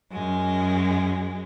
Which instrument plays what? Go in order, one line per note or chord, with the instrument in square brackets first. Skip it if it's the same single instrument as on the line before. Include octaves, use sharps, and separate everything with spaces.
[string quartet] F#2 G#3